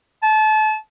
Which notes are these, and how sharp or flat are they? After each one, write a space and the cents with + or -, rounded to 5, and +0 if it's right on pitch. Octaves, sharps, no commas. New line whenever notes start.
A5 -30